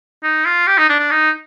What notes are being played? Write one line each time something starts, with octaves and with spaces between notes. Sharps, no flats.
D#4
F4
G4
D#4
D4
D4
D#4